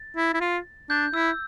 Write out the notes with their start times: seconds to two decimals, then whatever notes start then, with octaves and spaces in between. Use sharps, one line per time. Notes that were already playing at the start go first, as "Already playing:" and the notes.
Already playing: A6
0.16 E4
0.34 E4
0.40 F4
0.89 D4 G6
1.13 E4 E6